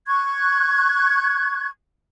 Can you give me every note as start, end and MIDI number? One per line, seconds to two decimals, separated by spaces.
0.06 1.68 85
0.06 1.68 90
0.06 1.68 92